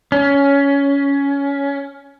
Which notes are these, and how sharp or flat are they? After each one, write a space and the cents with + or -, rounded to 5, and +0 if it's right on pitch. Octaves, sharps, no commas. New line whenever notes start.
C#4 +15